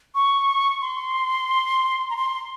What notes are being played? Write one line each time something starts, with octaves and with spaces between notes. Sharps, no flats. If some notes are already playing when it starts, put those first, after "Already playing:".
C#6
C6
A#5
C6